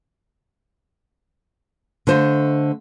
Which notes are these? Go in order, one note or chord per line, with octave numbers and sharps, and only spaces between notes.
D3 A3 C5 D#5 F5